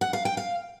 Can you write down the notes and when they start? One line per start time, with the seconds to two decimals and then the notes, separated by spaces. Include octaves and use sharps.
0.01 F#5
0.13 F5
0.25 G5
0.37 F5